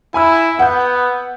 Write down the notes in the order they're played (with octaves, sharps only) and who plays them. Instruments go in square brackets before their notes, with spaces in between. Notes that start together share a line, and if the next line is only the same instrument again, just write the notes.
[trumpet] E4 [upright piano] G#5 B5 E6
[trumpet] B3 [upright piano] F#5 G6